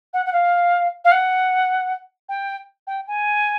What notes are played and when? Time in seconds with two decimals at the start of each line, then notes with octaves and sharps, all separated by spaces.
0.13 F#5
0.25 F#5
0.33 F5
1.04 F5
1.11 F#5
2.29 G5
2.87 G5
3.07 G#5